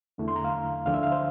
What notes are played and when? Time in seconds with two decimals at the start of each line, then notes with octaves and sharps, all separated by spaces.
0.18 E2 D3 A3 E4
0.28 C6
0.36 A#5
0.44 F5
0.86 D2 D3 F3 F5
0.94 E5
1.03 F5
1.12 C5